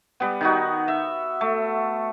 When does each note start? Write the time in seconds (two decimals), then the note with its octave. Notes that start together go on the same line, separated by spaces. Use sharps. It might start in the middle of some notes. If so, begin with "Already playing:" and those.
0.20 G3 B3
0.41 D#3 D#4 F#4
0.88 E5
1.41 A3